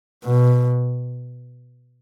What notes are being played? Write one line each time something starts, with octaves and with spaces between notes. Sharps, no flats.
B2